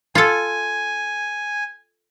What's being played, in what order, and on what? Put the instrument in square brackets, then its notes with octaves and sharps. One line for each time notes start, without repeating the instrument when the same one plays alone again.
[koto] F4 A4 [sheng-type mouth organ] G#5